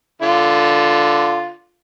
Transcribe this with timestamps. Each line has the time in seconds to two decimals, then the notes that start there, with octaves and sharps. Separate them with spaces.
0.22 D3 F4